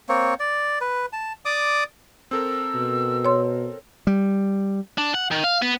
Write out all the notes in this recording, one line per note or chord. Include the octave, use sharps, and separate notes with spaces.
A#3 C4 C#5
D5
B4
A5
D5 D6 D#6
C4 A4 A#4 E6
B2
C#5 C6
G3
D4
F#5
D#3
F5
B3